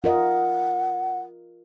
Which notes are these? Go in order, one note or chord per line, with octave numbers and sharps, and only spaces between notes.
F4 A#4 D#5 F#5